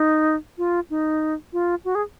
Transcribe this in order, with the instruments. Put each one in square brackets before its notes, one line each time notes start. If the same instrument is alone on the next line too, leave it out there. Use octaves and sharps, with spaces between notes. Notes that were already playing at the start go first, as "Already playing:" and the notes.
Already playing: [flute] D#4
F4
D#4
F4
F#4
G#4